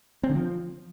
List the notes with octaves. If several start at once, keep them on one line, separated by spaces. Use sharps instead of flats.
C4
D3
F3